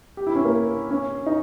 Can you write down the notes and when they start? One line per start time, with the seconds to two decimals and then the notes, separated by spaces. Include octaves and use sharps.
0.17 G4
0.27 E4
0.35 C#4
0.45 A#3
0.90 C#4
1.26 D#4